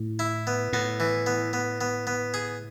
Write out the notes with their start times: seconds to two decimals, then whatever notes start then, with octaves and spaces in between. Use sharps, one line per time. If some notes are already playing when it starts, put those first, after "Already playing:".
Already playing: A2
0.19 E4
0.47 B3
0.73 A2 B3
1.00 E3
1.26 B3
1.53 B3
1.81 B3
2.07 B3
2.34 G#4